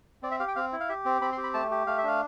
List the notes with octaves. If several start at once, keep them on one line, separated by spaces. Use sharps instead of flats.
C4 D5
E5
G4 F5
G5
C4 F5
E4
F5
G4 E5
C4
C4 B5
C6
G4
B5
A3 A5
G4
A3 F5
E5
D4 F5